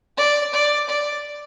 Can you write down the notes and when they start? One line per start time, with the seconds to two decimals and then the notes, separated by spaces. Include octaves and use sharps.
0.17 D5
0.53 D5
0.89 D5